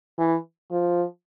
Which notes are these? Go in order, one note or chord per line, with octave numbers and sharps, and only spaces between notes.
E3
F3